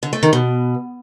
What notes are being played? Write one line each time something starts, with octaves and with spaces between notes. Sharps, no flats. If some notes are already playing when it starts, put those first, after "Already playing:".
D3
A3
D#3
B2